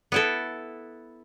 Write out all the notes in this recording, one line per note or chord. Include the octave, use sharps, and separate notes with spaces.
B3 E4 A4